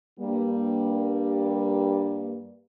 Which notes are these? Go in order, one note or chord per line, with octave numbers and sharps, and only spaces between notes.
G2 G3 A#3